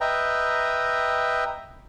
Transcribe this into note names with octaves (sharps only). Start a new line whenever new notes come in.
B4 D#5 E5 G5 A#5